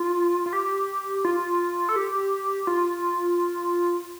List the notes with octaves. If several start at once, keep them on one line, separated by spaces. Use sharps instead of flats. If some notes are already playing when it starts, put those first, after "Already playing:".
Already playing: F4
F4
G4
F4
A4
G4
F4